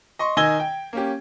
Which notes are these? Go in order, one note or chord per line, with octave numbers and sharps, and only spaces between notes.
D#5 C6 C#6
D#3 D#5 G#5 E6 G#6 G7
G5
A#3 C#4 G4